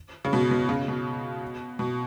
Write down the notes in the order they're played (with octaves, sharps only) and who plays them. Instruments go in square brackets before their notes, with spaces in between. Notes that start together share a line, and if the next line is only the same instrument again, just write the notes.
[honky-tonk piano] C#3
B2
B2
C#3
B2
B2